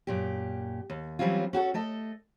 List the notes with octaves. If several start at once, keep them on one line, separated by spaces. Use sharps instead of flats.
F#2 A#2 G4
D#2
E3 F#3 G3 C4 C#4 F4
C#4 F#4 G4 A4
A3 A4 D#5